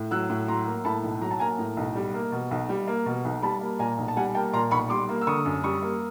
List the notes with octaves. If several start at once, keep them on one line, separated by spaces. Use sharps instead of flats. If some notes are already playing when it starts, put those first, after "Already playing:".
Already playing: A2
F#3 E6 F#6
A2
F#3 A#5 C6
A#3
A2 A5 B5
B1
F#3 A#5
A5
A#3 G#5 A#5
A2
B1
G3
A#3
B2
B1
G3
A#3
B2
B1
G3 A5 B5
A#3
A#2 G#5 A#5
B1
A5
G3 F#5 G#5
A#3 G5 A5
A#2 A#5 C6
B1 B5 C#6
G3 C6 D6
A#3
E6
D3 C#6 D#6
F#2
G3 C#6 D#6
A#3